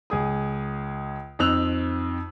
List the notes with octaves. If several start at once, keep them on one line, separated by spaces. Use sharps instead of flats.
C#2 G#4 D#6
F2 C4 D#4 E6 F#6 F7